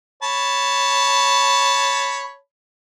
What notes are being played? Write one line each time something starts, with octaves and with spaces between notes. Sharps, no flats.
C#5 A5 B5